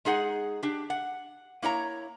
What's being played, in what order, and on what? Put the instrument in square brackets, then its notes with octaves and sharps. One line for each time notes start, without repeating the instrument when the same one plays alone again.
[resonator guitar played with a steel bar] G#3 D#4 G#4 F#5
D4 G4
F#5
A#3 E4 C#5 A#5